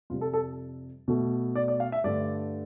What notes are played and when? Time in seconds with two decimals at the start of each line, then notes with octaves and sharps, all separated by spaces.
0.10 F2 C3 G3 F4
0.21 A4
0.33 A4
1.08 B2 A3
1.55 D5
1.68 D5
1.80 F5
1.92 E5
2.04 G2 D3 A3 D5